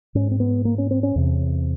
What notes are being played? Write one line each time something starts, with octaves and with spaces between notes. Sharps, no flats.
G#2 C#4
C4
B3
A#3
C#4
C4
C#4
E2 C3